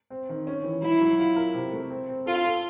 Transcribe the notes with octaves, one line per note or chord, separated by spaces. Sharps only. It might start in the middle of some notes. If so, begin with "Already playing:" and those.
C4
D#3
C#4
E3
F#3 E4
F#3
F4
A#4
C3
A3
C4
C4
F4 A4
A4